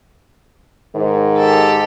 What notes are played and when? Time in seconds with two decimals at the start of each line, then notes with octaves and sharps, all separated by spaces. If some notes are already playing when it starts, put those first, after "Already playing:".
0.95 G#2 D#3
1.38 G4 A4